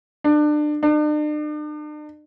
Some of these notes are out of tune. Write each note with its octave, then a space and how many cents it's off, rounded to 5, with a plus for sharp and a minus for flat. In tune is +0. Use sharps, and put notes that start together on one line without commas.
D4 +30
D4 +45